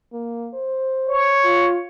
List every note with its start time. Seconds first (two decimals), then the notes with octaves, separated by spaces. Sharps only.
0.13 A#3
0.54 C5
1.09 C#5
1.44 F4